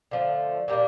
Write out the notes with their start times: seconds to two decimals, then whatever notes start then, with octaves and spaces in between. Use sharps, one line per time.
0.11 D3 F3 A3
0.68 A#2 G3 A#3 D4